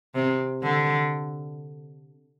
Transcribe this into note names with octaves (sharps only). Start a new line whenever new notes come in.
C3
D3